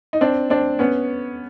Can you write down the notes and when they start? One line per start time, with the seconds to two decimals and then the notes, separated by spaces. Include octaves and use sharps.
0.13 D#4
0.21 C4 D4
0.50 C4 D4
0.79 B3 C#4